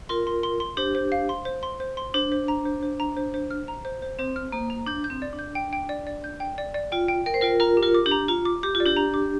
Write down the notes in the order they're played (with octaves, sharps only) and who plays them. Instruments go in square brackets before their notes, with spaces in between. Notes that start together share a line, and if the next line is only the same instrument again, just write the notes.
[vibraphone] F4 A#4 [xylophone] C6
[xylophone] C6
C6
C6
[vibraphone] D4 G4 [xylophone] C5
[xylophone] C5
F5
C6
C5
C6
C5
C6
[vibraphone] D4 [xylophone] C5
[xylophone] C5
A#5
C5
C5
A#5
C5
C5
F6
A#5
C5
C5
[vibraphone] C4 [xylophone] C5
[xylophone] F6
[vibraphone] A#3 [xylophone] C5
[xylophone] A#5
[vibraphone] D4 [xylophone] G6
[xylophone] G6
[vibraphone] C4
[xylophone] D5
[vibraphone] D4
[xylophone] G6
G5
G5
D5
D5
G6
G5
D5
D5
[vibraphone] F4 [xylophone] G5
[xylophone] G5
[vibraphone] A#4 [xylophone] G5
[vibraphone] C5
[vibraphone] F4 A#4 [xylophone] G5
[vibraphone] F4 A#4 [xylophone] A#5
[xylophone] G4
[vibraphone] F4 A#4
[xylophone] D6
[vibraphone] D4 G4
[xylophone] A#5
[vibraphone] F4 [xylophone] A#5
[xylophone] D6
[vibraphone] G4 [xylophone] D6
[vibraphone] F4
[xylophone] D5
[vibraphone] D4 G4
[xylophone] A#5
D6